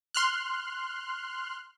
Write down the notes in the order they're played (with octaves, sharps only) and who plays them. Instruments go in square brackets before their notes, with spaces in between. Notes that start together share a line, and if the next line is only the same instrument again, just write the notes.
[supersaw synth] C6 F6 F#6